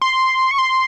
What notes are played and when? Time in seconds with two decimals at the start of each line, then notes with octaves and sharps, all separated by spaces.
0.02 C6
0.51 C#6
0.58 C6